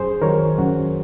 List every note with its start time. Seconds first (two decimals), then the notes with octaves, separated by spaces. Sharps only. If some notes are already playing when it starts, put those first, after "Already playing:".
Already playing: F#2 G#4 C5
0.22 D#3 F#3 A#4 C#5
0.58 F#2 F#4